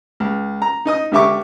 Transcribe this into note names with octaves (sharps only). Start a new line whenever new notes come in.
C#2
A#5
D#4 D#5 D#6
C#2 D3 G4 E5 C#6 D6